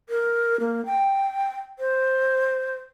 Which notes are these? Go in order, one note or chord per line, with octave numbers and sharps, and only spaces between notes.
A#4
A#3
G5
C5